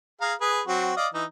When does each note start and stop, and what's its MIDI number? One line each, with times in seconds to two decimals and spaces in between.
0.21 0.34 68
0.21 0.34 77
0.21 0.34 82
0.41 0.61 68
0.41 0.61 71
0.68 0.92 54
0.68 0.92 60
0.68 0.92 66
0.97 1.08 74
0.97 1.08 75
0.97 1.08 77
1.14 1.25 52
1.14 1.25 63